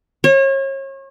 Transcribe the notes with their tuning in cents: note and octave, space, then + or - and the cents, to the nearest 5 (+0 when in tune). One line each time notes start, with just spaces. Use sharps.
C#5 -35